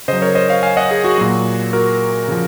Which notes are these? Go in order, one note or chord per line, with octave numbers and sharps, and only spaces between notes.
C#3 F#3 C5 D#5
A#4 C#5
C5 D#5
C#5 F5
F5 G#5
D#5 F#5
G#4
F#4
A#2 F#3
F#4 A#4
C#3 F3